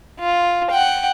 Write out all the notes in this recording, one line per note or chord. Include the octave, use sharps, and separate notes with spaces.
F4
F#5 G5